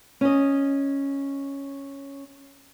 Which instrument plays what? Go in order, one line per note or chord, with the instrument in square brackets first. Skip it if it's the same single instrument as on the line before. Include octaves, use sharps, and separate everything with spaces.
[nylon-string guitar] C#4 D#5